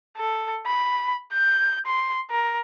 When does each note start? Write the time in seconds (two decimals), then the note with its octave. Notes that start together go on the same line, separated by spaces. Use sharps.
0.18 A4
0.66 B5
1.33 G6
1.86 C6
2.31 A#4